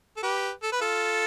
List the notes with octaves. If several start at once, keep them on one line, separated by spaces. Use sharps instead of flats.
A4
G4 B4
A4
B4
F4 A4